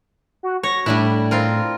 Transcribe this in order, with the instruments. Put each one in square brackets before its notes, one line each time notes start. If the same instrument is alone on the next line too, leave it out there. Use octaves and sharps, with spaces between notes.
[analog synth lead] F#4
[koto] C#5 [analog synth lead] A#6
[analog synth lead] A2 [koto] G3 D4 E4
[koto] C4 F4 A#4